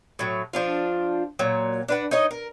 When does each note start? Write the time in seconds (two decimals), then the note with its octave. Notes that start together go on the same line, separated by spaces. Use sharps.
0.19 A2 F#3
0.53 F3 D4 F4
1.39 A#2 F#3
1.88 D4 B4 F#5
2.11 D#4 C#5 D#5
2.31 A#4